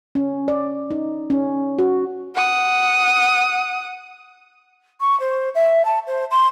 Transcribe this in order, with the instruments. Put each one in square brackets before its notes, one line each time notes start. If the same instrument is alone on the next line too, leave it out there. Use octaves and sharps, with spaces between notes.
[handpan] C#4
D5
D#4
C#4
F#4
[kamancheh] F#5 D#6
[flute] C#6
C5
E5
A5
C5
C6